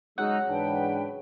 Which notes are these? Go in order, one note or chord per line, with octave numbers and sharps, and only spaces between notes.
C#3 F#3 G#3 D#4 F#4 F#5 E6
G#2 E3 D4 B4 G5 A5